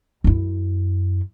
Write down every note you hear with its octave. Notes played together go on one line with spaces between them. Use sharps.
F#2 E4